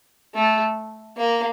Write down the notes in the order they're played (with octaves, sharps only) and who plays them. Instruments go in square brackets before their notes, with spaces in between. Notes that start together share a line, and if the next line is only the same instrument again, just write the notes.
[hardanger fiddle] A3
A#3